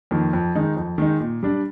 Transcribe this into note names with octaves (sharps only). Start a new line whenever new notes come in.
F2 D#3 A#3
F2
D#3 G#3 D#4
F2
D#3 G#3 D#4
A#2
G3 D4